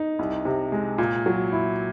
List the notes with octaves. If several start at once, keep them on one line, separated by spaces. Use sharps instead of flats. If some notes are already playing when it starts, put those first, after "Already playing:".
Already playing: D#4
C2
C3
G#3
A#2
F#3
E4